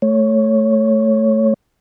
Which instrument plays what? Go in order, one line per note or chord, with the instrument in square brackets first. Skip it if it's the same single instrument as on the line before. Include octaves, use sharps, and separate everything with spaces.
[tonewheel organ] A3 C#5